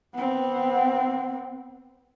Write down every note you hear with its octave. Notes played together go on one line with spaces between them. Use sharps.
B3 C4